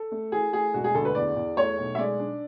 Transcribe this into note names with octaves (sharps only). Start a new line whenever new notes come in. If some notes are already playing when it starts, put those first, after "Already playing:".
Already playing: A4
A3
E3 G#4
A3 G#4
E1 F#4
G#4
D2 A4
B4
E2 D5
E2
A3 C#5
B1
E5
G#3 D5
D4